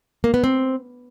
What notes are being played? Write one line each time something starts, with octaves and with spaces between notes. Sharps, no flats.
A#3
B3
C4